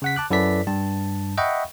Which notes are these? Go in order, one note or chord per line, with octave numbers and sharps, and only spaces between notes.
C#3 F#5 B6
A5 D6 F#6
F#2 E4 A4 B4 D5 B6
G2 A5
D#5 E5 F#5 G5 B5 C#6